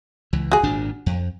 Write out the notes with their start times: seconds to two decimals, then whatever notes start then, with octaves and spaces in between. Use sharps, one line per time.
0.33 C#2 E3
0.52 F#4 G#4
0.63 G#1 A#2 D4
1.06 F2